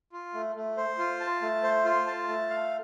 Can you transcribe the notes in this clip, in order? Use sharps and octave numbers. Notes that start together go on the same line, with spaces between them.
F4
A3
A3
C5
F4
A5
A3
C5
F4
A5
A3
F5